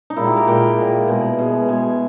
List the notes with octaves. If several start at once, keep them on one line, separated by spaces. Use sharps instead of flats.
D#4
A#2 G#3 E4
G4
A#4
A#2 G#3 G5
A#2 G#3
B2 G#3
B2 G#3
B2 G#3 G#5